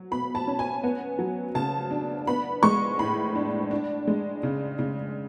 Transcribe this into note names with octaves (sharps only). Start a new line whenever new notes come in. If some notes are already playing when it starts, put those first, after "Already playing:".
Already playing: F#3
B2 B5
A5
C#4
G#5
B3
F#3
C#3 A5
D4
B3 B5
G#3 C#6
A2 B5
D4
D4
G#3
C#3
C#3